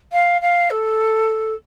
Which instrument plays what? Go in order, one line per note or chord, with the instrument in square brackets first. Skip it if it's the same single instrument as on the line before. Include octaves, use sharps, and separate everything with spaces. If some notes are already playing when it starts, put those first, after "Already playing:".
[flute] F5
F5
A4